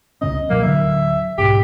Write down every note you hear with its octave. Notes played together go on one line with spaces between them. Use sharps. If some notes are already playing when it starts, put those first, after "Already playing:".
C#2 C3 C#4 D#5
B2 F#3 A#3
D1 D3 F#3 E5
B1 G#2 B2 G4